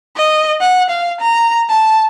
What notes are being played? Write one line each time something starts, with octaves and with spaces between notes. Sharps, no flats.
D#5
F#5
F5
A#5
A5